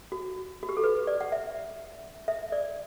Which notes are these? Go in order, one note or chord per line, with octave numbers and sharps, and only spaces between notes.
F#4
F#4
G4
A4
B4
D5
F#5
E5
E5
D5